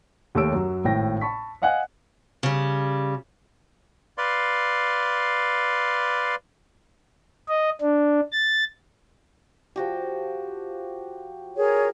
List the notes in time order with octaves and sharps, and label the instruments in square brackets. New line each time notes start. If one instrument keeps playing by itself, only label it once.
[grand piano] D#2 A3 G4 C#5 E6 D7
F#2 F#3
G#1 A2 G5 A#6
A5 B5 C#6 B6
D#5 F5 F#5 G#5 F#6
[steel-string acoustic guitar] C#3 G3
[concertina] B4 D5 F5 C6
[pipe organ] D#5
D4
A6
[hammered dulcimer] F3 F#4 G4
[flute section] G#4 A#4 C#5